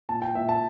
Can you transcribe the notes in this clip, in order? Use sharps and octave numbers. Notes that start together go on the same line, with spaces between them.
A#2 A5
G5
A#2 E5
A5